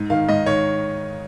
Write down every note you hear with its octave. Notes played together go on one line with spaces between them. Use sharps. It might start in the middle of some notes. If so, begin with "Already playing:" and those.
Already playing: G#2
D#3 F5
G#2 D#5
D#3 C#5